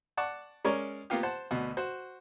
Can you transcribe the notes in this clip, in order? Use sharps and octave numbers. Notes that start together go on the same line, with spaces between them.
D5 F#5 A5 C#6 D6
G#3 C#4 A#4 C#5 D5
A#3 B3 F4 G4
C5 F#5 A5
D2 B2
F#4 C5